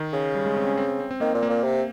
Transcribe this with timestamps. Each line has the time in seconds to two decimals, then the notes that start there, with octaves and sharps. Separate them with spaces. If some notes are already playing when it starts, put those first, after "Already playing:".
Already playing: D#3
0.13 C#3
0.35 G3
0.46 G#3
0.57 C4
0.67 C#4
0.78 C4
0.88 C4
1.00 C4
1.11 C4
1.20 D#3 A#3
1.35 A#2
1.43 A#3
1.50 A#2
1.64 C3